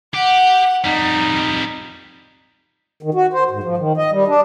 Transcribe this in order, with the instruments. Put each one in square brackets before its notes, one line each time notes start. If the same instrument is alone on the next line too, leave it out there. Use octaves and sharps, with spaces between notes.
[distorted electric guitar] G4 [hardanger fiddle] F#5
[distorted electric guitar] F2 G3 [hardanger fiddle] D#4
[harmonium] D#3
F#4
C5
G#2
F3
D#3
D#5
G3
D4